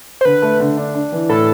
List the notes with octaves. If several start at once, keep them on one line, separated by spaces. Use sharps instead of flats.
C5
D3 B4
A3
D3
D4
D4
E3
A2 A4